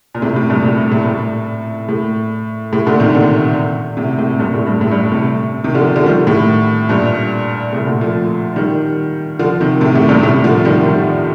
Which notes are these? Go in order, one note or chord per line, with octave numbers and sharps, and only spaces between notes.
A#2
A2 C3
A2 C3
G2 A#2
A2
A2
A2
A2
A2
A#2 D3
C3 D#3
A#2 D3
A2 C3
A2 C3
G2 A#2
A2
G2
A2
G2
G2
A2 C3
C3 D#3
D3 F3
D3 F3
D#3 G3
A2
G2 A#2
A2 C3
A#2 D3
F3 A3
D#3 G3
D3 F3
C3 D#3
A2 C3
A2 C3
G2 A#2
A2 C3
D3 F3
D#3 G3
D#3 G3